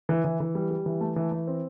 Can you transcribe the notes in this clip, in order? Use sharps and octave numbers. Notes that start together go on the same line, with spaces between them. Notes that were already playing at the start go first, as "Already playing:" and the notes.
E3
E3
E3
G3
G3
E3
A3
E3
E3
C4